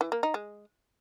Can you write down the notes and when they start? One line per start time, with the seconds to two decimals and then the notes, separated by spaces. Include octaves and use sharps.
0.01 E3
0.12 A#3
0.23 D#4
0.34 G#3